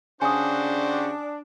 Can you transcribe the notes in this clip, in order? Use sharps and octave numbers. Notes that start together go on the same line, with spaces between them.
C#3 D4 F#4 G4 C5 G#5 D#6